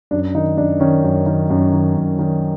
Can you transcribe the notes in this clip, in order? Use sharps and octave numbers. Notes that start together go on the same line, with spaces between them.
F#2 D4
D#3 D#4
F#2 D4
D#3 C#4
F#2
D#3
F#2
D#3
F#2
D#3